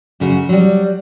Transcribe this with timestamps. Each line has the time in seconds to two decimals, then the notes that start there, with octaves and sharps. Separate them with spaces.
0.20 F#2 C#3 F#4
0.49 F#3 G3